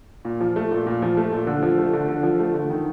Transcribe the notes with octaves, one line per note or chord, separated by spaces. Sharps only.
A#2
F3
A3
A#2
A#2
F3
A3
A#2
D3
F3
A3
D3
D3
F3
A3
D3
D#3